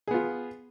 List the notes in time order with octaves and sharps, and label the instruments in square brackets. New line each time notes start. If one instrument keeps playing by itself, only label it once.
[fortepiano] G#4
B3
F4